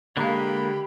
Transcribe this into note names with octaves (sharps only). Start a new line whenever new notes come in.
D3 G#3 A#3 G4 B5